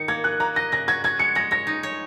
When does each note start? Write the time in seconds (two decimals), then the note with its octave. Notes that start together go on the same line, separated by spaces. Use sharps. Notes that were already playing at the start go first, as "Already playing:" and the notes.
Already playing: D#3 D#4 C#7
0.08 A#3 G#6
0.24 G#4 F#6
0.40 A#3 A#5
0.56 D#5 A#6
0.72 C#3 A#6
0.88 F#4 G#6
1.04 F#4 G#6
1.19 G#3 C#7
1.35 G#3 A#6
1.51 C#5 A#6
1.67 D#4
1.83 C#5